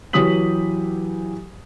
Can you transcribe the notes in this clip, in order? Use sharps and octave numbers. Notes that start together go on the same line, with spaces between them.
E3 F#3 G4 D#6 B6 F#7